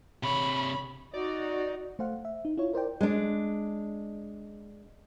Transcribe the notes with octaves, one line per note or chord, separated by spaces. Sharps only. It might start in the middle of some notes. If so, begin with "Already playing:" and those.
C3 C#5 B5
D#4 F#4 D5
A3 C5 F5 F#5
E5
D#4
E4 F4 C#5
A#4 C5 D5 G5
G#3 D4